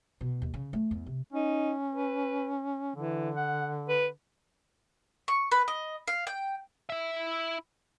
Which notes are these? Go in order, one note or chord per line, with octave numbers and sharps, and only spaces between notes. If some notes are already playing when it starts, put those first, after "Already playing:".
B2
D#2
C#3
A3
E2
C3
C#4 D#4
B4
D3 E3
F#5
B4
C#6
B4
D#5
F5
G5
E4 E5